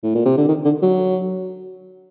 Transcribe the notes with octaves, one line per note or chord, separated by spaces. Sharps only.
A2
A#2
C3
D3
D#3
D3
F#3